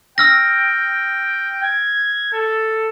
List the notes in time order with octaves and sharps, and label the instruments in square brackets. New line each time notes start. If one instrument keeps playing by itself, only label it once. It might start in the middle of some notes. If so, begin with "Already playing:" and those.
[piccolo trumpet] G5 [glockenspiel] E6 F6 A#6
[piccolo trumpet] G#6
A4